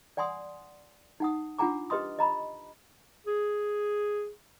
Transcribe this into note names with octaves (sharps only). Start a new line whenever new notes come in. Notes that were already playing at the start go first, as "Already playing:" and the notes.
D5 F#5 G#5 C6 D#6
D#4 F#5 D#6
D4 F4 F#5 G#5 A#5 D6
G4 B4 D#5 C6 D#6
D#5 A#5 B5
G#4